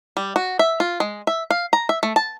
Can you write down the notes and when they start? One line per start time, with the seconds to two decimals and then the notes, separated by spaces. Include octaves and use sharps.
0.17 G3
0.36 F#4
0.59 E5
0.80 F4
1.00 G#3
1.27 E5
1.50 F5
1.73 A#5
1.89 E5
2.03 A3
2.16 A5